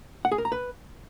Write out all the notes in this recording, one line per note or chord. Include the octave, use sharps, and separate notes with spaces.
F#5
G#4
A#4
A#5
B4